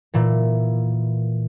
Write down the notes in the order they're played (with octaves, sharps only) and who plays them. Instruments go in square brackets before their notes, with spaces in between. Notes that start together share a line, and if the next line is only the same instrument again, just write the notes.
[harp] A#2 E3